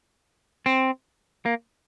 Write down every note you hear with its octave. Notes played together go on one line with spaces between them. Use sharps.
C4
A#3